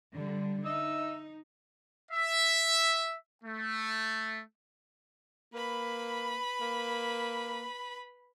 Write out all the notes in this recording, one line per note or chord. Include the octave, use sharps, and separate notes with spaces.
D3 G3
D#4 D#5 E5 E6
E5
A3
A#3 B4 B5
A#3